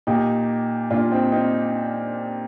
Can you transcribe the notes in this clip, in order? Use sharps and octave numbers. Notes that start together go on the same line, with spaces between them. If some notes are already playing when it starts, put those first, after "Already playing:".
A#2 D#4 G4
A#2 D4 F4
C4 D#4
C4 D#4